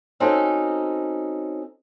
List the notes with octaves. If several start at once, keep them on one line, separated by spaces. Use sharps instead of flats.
C4 C#4 D#4 F#4 A4